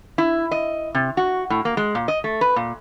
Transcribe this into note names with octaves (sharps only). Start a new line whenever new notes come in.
E4
D#5
C3
F#4
A2
A#3
G#3
A#2
D#5
A3
B4
A#2